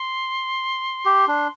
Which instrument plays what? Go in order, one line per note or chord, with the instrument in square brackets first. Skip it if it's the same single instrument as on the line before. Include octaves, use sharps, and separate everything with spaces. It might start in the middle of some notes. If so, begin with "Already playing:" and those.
Already playing: [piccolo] C6
[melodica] G4
D4